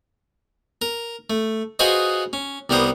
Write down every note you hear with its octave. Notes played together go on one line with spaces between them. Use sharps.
A#4
A3
F4 F#4 G#4 B4 C5 D#5
C#4
C2 G3 B3 A#4 C5 D#6